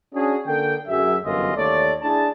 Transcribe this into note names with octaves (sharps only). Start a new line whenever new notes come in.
C#4 D4 F#4 G#4
D3 A#3 A4 G5
F#2 F#3 G#4 E5
G1 F#2 E3 F4 D#5
D#2 A3 C#5 D5
D4 E4 G#4 A5